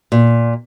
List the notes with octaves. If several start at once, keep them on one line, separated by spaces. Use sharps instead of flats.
A#2